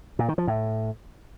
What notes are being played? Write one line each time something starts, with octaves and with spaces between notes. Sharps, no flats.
A#2
D#3
F3
A2